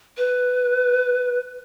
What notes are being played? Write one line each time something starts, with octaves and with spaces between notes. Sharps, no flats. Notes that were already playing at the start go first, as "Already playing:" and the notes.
B4